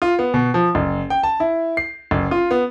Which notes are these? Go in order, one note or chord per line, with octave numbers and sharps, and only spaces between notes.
F4
B3
B2
F3
F#1
G5
A5
E4
C7
F#1
F4
B3